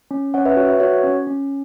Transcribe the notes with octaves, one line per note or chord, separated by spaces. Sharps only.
C#4
C#4 C#5 F#5
B4 E5
F#4 C#5
B4 E5
F#4 C#5 F#5
C#4
C#4